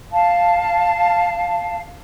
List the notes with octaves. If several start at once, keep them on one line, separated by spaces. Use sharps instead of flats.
F5 A5